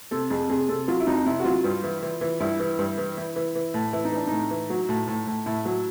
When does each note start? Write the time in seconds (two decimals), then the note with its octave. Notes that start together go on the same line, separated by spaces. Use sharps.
0.11 C3 A4
0.30 F2 G#4
0.49 C3 G#4
0.69 C3 A4
0.88 F#3 F4
1.00 E4
1.07 F2 D#4
1.26 C3 E4
1.40 F#4
1.45 F#3 F4
1.64 G2
1.83 E3
2.02 E3
2.21 E3
2.40 G2 E4
2.60 E3
2.79 G2
2.98 E3
3.17 E3
3.36 E3
3.55 E3
3.74 A2
3.93 E3 E4
4.05 D#4
4.12 E3 D4
4.27 A2 D#4
4.50 E3
4.70 F#3
4.89 A2
5.07 A2
5.27 A2
5.46 A2 E4
5.65 F#3